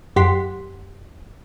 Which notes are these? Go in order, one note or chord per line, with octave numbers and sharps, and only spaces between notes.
F#2 G4 F#5 C6 B6